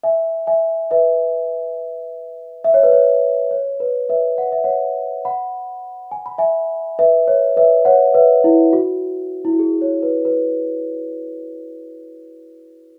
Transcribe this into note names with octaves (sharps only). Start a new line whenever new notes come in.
E5 G#5
E5 G#5
B4 E5
E5
C#5
B4
C#5
C#5
B4
B4 E5
F#5
E5
C#5 F#5
F#5 B5
G#5
B5
E5 G#5
B4 E5
C#5
B4 E5
C#5 F#5
B4 E5
E4
F#4
E4
F#4
G#4
C#5
B4
B4